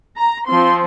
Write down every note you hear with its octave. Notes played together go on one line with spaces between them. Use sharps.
A#5
F3 C4 C6